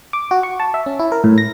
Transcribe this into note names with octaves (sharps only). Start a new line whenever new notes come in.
D6
F#4
C#6
A5
E5
C#4
E4
A#4
A2
A#6